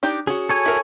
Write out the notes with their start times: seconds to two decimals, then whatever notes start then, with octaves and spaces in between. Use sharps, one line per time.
0.03 D4 D#4 G4
0.27 C#4 F#4 G#4
0.49 A4 C#5 G#5
0.66 E4 A#4